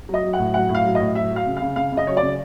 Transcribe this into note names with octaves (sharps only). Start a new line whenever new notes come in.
F#3 D#5
F#3
F#5
A2
F#3 F#5
A2
F5
F#3
A2 D#5
F#3 E5
F#3
F5
C#3
C#3 F5
C#3 F5
C#3
D#5
F#3 C#5
D5
C#3